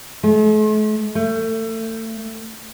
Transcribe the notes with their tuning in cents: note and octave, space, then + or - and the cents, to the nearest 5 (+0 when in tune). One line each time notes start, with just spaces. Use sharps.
A3 -45
A3 +30